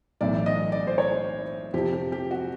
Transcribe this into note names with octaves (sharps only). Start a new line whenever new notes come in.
B1 A2 E3 D5
D#5
D5
C5
C#5
F2 C3 F3 G4
G4
G4
F#4